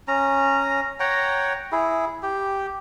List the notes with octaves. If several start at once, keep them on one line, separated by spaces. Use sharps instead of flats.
C#4 A#5
C#5 F#5 G5 A#5
E4 G#4
G4